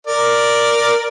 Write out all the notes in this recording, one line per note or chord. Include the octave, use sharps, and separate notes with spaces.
A#4 D5